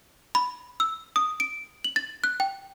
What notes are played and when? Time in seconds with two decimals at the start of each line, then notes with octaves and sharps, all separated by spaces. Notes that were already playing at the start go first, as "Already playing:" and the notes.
0.35 B5
0.80 E6
1.16 D#6
1.40 D7
1.84 F#7
1.96 A6
2.24 F#6
2.40 G5